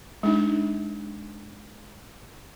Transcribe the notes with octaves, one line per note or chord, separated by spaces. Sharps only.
G#3 D4 D#4